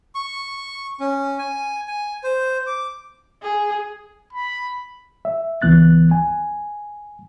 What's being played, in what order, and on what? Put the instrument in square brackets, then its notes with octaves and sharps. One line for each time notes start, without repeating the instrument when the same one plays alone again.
[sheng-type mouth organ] C#6
C#4
G#5
G#5
C5
D6
[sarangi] G#4
[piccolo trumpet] B5
[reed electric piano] E5
C#2 E3 B3 F#6 A6
G#5